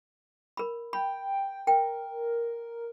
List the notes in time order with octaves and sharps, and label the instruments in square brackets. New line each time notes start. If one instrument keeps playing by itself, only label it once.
[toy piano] A#4 B5
[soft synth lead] G5 [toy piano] B5
[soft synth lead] A#4 [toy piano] G5